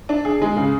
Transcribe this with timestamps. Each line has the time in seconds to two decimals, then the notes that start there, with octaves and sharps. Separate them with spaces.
0.09 D4
0.25 G#4
0.42 G#3
0.57 C#3